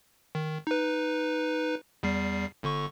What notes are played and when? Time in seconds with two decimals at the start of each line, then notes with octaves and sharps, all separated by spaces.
0.35 D#3
0.67 D#4 B4
2.03 E2 G3 C7
2.63 G1 D3 C#6